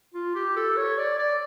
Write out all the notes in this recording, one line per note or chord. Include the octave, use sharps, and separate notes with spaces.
F4
G4
A4
C#5
D5
D5